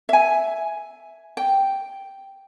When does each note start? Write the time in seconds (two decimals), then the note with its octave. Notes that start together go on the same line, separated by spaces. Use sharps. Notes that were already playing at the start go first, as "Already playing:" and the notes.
0.09 E5 G#5
1.37 G5